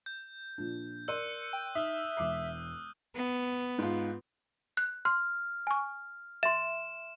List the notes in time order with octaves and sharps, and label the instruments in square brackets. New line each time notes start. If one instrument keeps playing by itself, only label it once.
[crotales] G6
[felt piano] A#2 F3 D4
[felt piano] A#4 D5 C6 [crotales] E6 F#6 D#7 [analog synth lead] C#7
[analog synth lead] G5
[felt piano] D#4 [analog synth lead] E5 [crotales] D#6 F6
[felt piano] E1 D6 C7
[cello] B3
[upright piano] G#2 F4
[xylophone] F#6
[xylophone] C6 [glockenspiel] F6
[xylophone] G#5 C#6
[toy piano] E5 C6 [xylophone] A6 [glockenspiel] E7